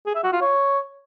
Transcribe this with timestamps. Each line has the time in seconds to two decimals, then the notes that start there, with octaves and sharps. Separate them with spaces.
0.06 G#4
0.15 E5
0.24 F#4
0.32 F4
0.41 C#5